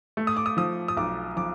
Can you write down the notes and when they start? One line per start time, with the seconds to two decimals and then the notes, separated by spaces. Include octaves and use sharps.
0.17 A3
0.27 D#6
0.37 D6
0.46 D#6
0.57 F3 D#6
0.88 D#6
0.97 B1 D6
1.36 F3 D6